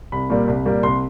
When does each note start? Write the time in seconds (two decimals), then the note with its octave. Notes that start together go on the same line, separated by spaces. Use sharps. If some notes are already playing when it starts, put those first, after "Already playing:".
0.12 C2 B5
0.30 A#2 G3 A#3
0.48 C2
0.66 A#2 G3 A#3
0.83 C2 C6